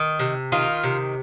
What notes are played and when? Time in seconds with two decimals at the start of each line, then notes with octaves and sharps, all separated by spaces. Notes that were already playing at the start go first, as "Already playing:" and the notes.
Already playing: D#3
0.20 C3
0.52 D#3 F4
0.84 C3